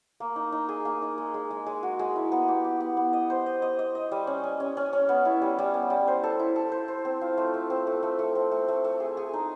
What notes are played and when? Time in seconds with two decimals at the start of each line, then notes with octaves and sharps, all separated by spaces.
0.20 A#3
0.36 D#4
0.52 D#4
0.69 G#4
0.85 A#3
1.02 D#4
1.18 G#3
1.34 G#3
1.51 G#3
1.66 G#3
1.83 F#4
1.99 G#3
2.16 E4
2.32 B3
2.48 G4
2.64 G4
2.80 B3
2.97 B3
3.13 D#5
3.30 C5
3.46 D#5
3.62 D#5
3.79 D#5
3.95 D#5
4.12 G3
4.27 C#4
4.44 C#4
4.60 C#4
4.77 C#4
4.93 C#4
5.09 B3
5.25 E4
5.42 G3
5.59 G3
5.74 B3
5.90 G3
6.08 C5
6.23 A4
6.39 E4
6.56 A4
6.72 C5
6.88 C5
7.05 C4
7.21 F4
7.38 A3
7.54 A3
7.70 C4
7.87 A3
8.03 A3
8.19 A3
8.35 C4
8.51 A3
8.68 A3
8.84 A3
9.00 G#4
9.17 G#4
9.34 D#4